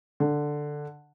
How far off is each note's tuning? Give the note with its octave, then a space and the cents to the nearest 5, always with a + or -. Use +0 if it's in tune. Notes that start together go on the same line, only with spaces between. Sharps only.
D3 +5